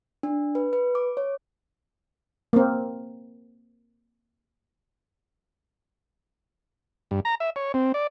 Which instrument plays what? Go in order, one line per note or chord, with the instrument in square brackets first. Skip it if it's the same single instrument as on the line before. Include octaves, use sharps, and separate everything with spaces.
[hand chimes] D4
B4
B4
D6
C#5
[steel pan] A#3 C4
[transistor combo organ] G2
A#5
E5
C#5
C4
D5